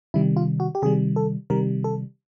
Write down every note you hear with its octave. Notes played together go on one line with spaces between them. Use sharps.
C3 D#3 G3 E4
F4
F#4
G4
C3 D#3 G3 G#4
A4
C3 D#3 G3 A#4
A4